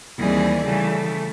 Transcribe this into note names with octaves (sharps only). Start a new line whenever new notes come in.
D#2 E3 G3 C4 G#4 D5
C#3 E3 G3 A3